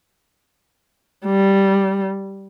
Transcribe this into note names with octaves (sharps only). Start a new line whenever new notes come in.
G3